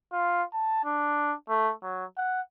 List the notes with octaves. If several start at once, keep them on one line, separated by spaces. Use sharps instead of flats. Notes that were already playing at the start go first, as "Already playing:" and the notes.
F4
A5
D4
A3
F#3
F#5